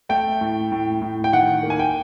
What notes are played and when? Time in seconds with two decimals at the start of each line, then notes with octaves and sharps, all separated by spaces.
0.09 A3 G5
0.41 A2
0.72 A2
1.02 A2
1.24 G5
1.33 D#3 F#5
1.63 A#3
1.70 G#5
1.79 G5